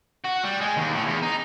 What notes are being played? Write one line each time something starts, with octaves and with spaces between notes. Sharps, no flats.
F#4
G3
G#3
D#2
A2
E2
D#4